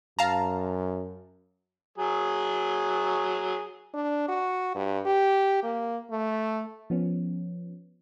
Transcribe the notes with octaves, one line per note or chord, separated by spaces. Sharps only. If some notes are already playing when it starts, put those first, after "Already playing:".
F#2 F5 A5 A#5
F#3 G#4
D4
F#4
G2
G4
A#3
A3
F3 B3 C#4